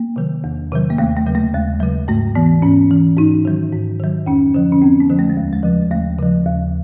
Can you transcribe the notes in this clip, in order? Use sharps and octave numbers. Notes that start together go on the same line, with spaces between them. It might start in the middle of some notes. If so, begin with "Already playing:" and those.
Already playing: A#3
C3 D#3 F#3
E2
C3 D#3 F#3
A#3
D#2 A3
A3
C#3 F#3
A3
D#2 G#3
C#3 F#3
G#2 A3
E3 B3
G#2 C#4
E3
G#2 D#4
D#3 F#3
G#2
D#3 F#3
F2 C#4
D3 F3
C#4
F2 C4
B3
D3 F3
A3
G#3
D#2
G#3
C#3 F3
D#2 A3
C#3 F3
D#2